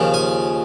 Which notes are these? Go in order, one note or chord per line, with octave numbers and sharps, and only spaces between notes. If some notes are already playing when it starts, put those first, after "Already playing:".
Already playing: D#2 C#3 F3
G#5